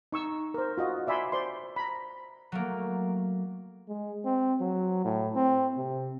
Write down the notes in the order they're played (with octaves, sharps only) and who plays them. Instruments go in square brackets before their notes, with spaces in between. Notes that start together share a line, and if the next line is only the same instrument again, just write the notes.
[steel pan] D#4 C#6 E6
A#4 C5
F4 F#4 D#5
D5 E5 G#5 B5 C6
C5 D5 C6
A#5 B5
[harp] F#3 A3 A#3
[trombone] G#3
C4
F#3
A2
C4
C3